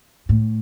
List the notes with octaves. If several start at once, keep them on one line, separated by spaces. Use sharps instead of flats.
A2